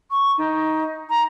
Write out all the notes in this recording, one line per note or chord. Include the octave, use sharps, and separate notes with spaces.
C#6
D#4
A#5